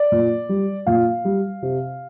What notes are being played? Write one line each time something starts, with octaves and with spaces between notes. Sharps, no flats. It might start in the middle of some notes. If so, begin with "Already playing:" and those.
Already playing: D5
A#2
G3
A#2 F5
G3
C3